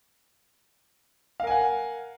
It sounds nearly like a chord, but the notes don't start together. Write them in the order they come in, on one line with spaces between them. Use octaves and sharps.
F5 A#4 G#5 F#5